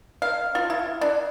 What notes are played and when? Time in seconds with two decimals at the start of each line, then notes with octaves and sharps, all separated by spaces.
0.22 F5
0.55 F4
0.70 E4
1.01 D4